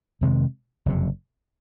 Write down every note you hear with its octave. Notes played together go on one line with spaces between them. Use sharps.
F2 C3 D#3 G#3
F#1 F2 C3